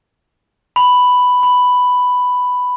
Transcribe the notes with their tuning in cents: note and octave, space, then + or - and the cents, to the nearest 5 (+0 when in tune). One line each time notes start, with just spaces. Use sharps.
B5 +5
B5 +5